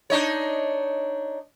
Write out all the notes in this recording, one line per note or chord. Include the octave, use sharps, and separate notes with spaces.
D4 D#4 C#5